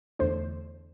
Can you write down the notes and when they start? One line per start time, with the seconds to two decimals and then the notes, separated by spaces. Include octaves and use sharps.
0.19 E2 D3 A3 D4 C5